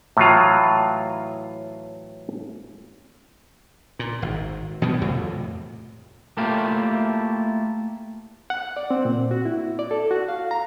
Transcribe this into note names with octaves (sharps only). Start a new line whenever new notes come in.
A2 E3 F#3 F4
A#2
G#1
B2 D#3 E3 G3
F2 A2 C3
A3 A#3 E4 F4 G4
F#5
D5
C4
A#2
F#4
E4
D5
A4
F#4
F5
A#5